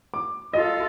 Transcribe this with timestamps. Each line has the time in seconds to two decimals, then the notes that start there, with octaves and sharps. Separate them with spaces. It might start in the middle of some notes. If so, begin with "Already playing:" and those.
0.14 D6
0.53 F4 A4 D#5